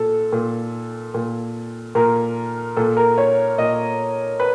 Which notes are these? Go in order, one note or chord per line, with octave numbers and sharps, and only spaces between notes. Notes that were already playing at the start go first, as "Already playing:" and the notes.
Already playing: A#2 A4
A#2
A#2
A#2 A#4
A#2 A4
A#4
C#5
A#2 D#5
B4